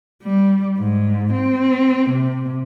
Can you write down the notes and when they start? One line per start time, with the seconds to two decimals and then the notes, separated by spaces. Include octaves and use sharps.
0.22 G3
0.79 G#2
1.33 C4
2.10 C3